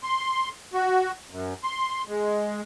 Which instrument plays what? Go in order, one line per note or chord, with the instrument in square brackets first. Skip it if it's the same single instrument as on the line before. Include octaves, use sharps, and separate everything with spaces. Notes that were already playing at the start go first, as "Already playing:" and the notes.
[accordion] C6
F#4
F#2
C6
G#3